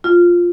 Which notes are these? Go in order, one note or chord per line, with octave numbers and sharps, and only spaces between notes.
F4